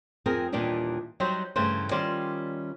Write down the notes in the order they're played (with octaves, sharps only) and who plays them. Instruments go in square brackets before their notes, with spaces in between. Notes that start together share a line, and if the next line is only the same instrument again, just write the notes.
[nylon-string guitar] F2 C4 G#4 A#4
D#2 A#2 E3 G3 D4 D#4
F#3 G3 D#4 F#4 C5
G2 C#3 E3 A3 C5
D#3 G3 C#4 F4 C5 D5